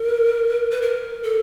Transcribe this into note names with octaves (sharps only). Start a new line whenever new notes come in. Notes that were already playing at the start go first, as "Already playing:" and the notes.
Already playing: A#4
B4
A#4
A4